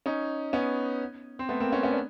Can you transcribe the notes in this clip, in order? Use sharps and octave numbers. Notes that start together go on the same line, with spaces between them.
C#4 D#4
B3 C#4
C4
A3 B3
A#3 C4
B3 C#4
B3 C#4
D4